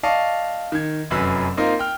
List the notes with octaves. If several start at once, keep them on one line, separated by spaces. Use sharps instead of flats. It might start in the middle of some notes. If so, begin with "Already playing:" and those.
D5 D#5 F5 A5 C#6
D#3 G#6
F1 F#2 F#3 B4 B5 E6
A#3 C4 D#4 F4 A#4
G5 F6